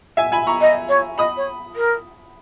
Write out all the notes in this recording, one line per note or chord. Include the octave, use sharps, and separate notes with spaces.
E5 G#5
G#5 B5
A#5 C#6
D#5
C#5
D#5 B5 D#6
C#5
A#4